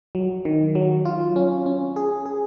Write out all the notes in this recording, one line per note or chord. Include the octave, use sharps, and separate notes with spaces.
F#3
D#3
F#3
F4
C#4
C#4
G#4
G#4